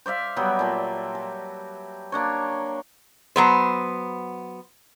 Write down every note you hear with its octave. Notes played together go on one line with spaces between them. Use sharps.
C5 D5 E5 F5
F#3 G3 B3 G4
A#2 A5
A5
A#3 D4 C#5
F#3 B3 C5